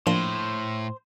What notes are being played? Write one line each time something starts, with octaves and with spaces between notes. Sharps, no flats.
A2 F3 A#3 D4 C5